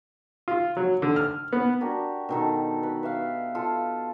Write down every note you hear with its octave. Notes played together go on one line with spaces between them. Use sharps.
F4
F#3
D3
F6
B3
D4 F#4 G4 A#4
B2 D#3 A4
B4
B4 E5 F5
F4 A4